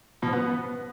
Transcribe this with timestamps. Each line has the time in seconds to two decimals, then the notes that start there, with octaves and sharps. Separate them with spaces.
0.22 B2
0.28 F3
0.33 B3